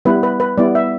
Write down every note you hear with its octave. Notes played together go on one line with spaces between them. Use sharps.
G3 B3 E4 B4
B4
B4
G3 B3 E4 D5
E5